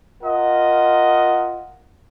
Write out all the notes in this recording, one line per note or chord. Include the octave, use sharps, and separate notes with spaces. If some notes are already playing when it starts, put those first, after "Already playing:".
F4 A#4 D#5 F#5